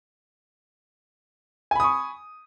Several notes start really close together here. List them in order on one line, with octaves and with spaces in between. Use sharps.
G#5 B5 D#6 C#6